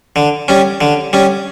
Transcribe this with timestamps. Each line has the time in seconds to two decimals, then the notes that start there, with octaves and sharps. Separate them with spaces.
0.16 D3
0.48 G3 C#4
0.81 D3
1.13 G3 C#4